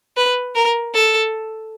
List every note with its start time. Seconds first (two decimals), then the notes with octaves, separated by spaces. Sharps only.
0.17 B4
0.55 A#4
0.94 A4